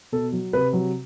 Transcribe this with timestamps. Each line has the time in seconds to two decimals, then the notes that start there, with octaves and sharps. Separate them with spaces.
0.12 B2 A4
0.32 F#3
0.53 C3 B4
0.73 F#3